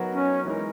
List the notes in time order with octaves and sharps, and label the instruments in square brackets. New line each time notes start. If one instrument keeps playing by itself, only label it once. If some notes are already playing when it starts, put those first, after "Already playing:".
Already playing: [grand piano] F#3 B3 D#4 F#4 A#4
[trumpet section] C#4
[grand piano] E3 G#3 D#4 A#4